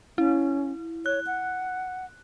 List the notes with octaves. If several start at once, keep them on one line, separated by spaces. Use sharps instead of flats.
C#4 E4
C#5 F#6
F#5